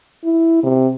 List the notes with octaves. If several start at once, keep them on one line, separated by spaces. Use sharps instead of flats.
E4
C3